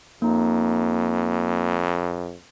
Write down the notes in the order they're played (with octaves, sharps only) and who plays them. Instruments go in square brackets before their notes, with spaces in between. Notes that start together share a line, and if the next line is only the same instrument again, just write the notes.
[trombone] F2 [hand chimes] A#3 D#4 A#5